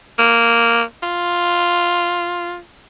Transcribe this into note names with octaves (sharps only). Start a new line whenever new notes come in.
A#3
F4